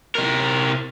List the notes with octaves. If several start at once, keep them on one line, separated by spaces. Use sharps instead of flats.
C3 A#4